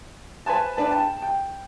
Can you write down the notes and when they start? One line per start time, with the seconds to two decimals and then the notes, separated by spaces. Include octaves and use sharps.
0.46 B4 C5 G#5 A5
0.77 D4 B4 A5
0.90 G5 A5
1.22 G5